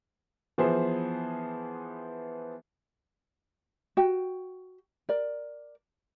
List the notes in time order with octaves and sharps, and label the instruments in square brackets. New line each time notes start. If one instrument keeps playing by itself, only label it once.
[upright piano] E3 F3 B3 G#4 C5 E5
[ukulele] F#4 G5
A#4 D5